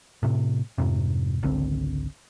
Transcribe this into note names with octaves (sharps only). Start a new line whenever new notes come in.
A2 C3
F2 G#2 C3
G#1 C#2 D3 C4